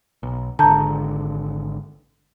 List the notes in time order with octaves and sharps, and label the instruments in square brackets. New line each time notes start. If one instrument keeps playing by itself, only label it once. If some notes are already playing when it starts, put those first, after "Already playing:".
[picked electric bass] B1
[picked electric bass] G#1 D3 [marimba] A5 A#5 G6